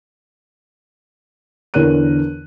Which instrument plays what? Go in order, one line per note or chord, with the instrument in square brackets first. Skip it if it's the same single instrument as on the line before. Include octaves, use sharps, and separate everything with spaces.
[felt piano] E2 D3 A#4 C#5 F#6 D#7